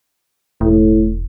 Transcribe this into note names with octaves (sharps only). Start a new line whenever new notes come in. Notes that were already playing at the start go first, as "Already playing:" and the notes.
E1 A2